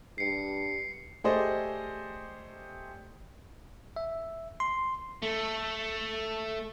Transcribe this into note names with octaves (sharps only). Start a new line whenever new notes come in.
G2 C7 C#7
A3 G4 G#4 C5 D5 D#5
E5
C6
A3